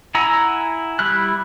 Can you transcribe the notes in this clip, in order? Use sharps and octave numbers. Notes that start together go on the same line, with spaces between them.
E4 F#5 G#5 A#5 E6
G3 E4 F6 F#6